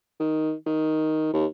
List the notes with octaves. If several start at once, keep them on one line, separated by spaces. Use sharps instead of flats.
D#3
D#3
D#2